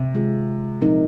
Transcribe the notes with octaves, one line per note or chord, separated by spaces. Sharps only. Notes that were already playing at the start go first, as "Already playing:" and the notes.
Already playing: C3
D#3 G#3 F4 G#4
A#2 F3 C4 D#4 A#4